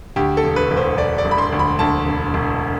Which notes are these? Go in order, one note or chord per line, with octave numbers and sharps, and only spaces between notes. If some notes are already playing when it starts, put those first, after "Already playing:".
D2 G4
A4
E1
B4
E1
C5
E1 D5
D5
E1
B5
C6
D2
B5
D2 A5
E1
E1